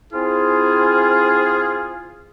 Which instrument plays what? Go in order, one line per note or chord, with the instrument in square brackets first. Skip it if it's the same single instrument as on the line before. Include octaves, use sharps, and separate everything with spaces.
[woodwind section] C4 E4 F4 [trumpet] G#4